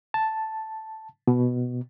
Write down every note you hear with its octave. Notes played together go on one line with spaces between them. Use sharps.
A5
B2